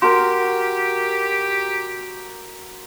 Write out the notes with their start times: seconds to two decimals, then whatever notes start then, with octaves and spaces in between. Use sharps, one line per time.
0.02 F#4 G4 A#4 A#5 C6